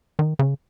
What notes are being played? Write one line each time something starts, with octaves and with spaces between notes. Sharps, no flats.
D#3
C#3